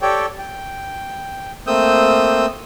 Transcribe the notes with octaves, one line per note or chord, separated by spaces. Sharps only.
G4 A4 C#5 D5 G5
G5
A3 A#3 C4 D#6 E6 G6